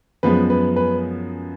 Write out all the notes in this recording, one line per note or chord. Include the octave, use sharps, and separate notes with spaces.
F#2 F3 G#3 B3 B4
B4
B4